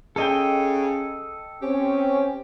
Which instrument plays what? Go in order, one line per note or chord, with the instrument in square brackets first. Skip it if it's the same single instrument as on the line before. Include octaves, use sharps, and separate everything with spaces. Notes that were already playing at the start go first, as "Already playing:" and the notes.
[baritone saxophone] C#3 [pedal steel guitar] A4 D#5 G5
[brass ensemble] C4 C#4 [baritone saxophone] G4